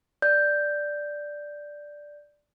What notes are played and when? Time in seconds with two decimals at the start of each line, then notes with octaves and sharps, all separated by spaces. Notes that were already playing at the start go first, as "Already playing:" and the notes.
0.22 D5 G6